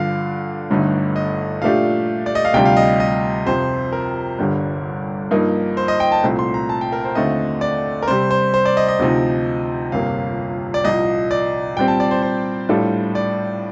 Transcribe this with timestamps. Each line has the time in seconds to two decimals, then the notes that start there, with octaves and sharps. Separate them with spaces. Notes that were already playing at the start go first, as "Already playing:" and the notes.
Already playing: G2 D3 F3 F5
0.70 G1 G2 D3 A3 D#4
1.16 D#5
1.62 A#2 F3 A3 D4 G4 F5
2.26 D5
2.35 D#5
2.45 F5
2.54 D2 C3 G3 D4 F4 G5
2.65 F5
2.77 D#5
3.00 D#5
3.46 F2 C3 F3 C5
3.93 A#4
4.39 G1 G2 D3 G3
5.31 G2 F3 A#3 D#4
5.77 C5
5.88 D#5
6.00 G5
6.12 A5
6.23 C2 A#2 A3 C4
6.39 C6
6.54 A#5
6.69 A5
6.81 G5
6.92 A#4
7.04 C5
7.15 D#2 D3 A3 C4 F4 D#5
7.61 D5
8.02 A#4
8.08 C3 G3 C4 C5
8.31 C5
8.54 C5
8.65 D5
8.77 D#5
8.88 D#5
8.99 D2 C3 F3 C4 D#4
9.92 G1 F2 C3 F3 A#3 F5
10.74 D5
10.84 C2 A#2 F3 D#5
11.31 D5
11.76 A#2 G3 C4 G5
11.88 A5
12.00 D5
12.11 C5
12.23 C5
12.69 A2 G3 D4 F4 A4
13.15 D5